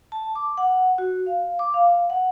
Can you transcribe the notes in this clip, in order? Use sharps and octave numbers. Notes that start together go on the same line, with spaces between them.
A5
D6
F#5
F#4
F5
D6
F5
F#5